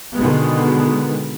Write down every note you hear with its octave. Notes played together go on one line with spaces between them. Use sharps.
B2 D3 D#3 G#3 B3